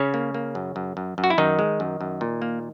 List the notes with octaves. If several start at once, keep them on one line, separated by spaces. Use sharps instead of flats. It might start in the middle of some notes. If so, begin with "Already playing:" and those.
Already playing: C#3 C#4
A#3
A#3
F#2
F#2
F#2
F#2
F#4
E4
F#2 D#3 D#4
G#3
F#2
F#2
A#2
A#3